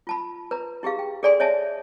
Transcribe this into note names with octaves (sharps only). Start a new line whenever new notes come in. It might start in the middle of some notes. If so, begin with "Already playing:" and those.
F4 A5 B5
B4 A#5
E4 G4 G#4 F5
G5
G#4 A4 D5 G#5 C6
C#5 D#5 E5 G#5 A5